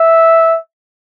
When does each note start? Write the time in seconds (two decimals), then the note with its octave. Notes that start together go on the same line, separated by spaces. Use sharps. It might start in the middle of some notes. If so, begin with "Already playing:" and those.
Already playing: E5